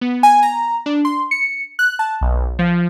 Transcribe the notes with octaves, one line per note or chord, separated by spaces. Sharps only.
B3
G#5
A#5
D4
C6
C#7
F#6
A5
B1
F3